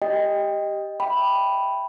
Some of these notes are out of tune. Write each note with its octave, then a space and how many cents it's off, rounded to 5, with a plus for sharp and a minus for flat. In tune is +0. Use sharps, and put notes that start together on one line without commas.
G4 +0 D#5 +0 G5 +20
E5 +0 G5 +0 B5 +0